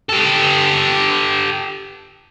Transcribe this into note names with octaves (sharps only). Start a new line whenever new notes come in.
G4 A4